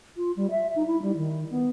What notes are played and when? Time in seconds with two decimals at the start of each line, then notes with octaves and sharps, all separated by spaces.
0.17 F4
0.37 G3
0.51 E5
0.76 D#4
0.87 E4
1.02 G3
1.17 D#3
1.51 B3